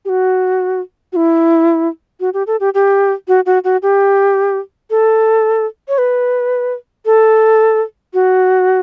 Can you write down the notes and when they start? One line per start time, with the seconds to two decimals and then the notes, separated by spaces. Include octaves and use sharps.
0.05 G4
0.09 F#4
1.13 F#4
1.16 E4
2.20 F#4
2.34 G4
2.47 A4
2.60 G4
2.74 G4
3.28 F#4
3.46 F#4
3.64 F#4
3.82 G4
4.90 A4
5.88 C#5
5.98 B4
7.05 A4
8.13 F#4